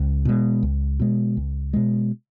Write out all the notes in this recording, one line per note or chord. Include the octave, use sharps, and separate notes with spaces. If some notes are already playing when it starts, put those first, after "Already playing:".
Already playing: C#2
B2 G#3
C#2
B2 G#3
C#2
B2 G#3